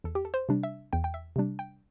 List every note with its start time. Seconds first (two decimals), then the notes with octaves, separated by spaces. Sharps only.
0.04 E2 A4
0.15 G4
0.25 A4
0.34 C5
0.49 C3 G3 D4
0.63 E5
0.93 E2 G5
1.04 G5
1.14 E5
1.36 C3 G3 D4
1.59 G5